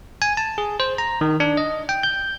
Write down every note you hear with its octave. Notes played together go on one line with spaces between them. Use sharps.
G#5
A5
G#4
C5
A#5
D#3
D4
D#5
G5
G6